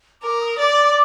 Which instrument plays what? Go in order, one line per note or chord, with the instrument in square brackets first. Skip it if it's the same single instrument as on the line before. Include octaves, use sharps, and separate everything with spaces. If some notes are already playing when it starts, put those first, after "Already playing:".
[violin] A#4 [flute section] D6
[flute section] D#6
[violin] D5 [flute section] D6